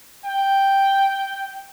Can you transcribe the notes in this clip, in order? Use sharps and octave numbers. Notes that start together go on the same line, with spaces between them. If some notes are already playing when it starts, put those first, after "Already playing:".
G5